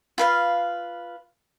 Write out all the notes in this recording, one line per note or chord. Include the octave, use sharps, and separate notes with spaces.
F4 B4 F5